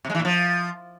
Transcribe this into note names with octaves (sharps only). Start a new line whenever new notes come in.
C3
G#3
E3
A#2
F3